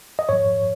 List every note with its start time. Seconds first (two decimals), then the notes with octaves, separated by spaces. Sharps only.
0.19 D#5
0.29 G#2 F3 C#5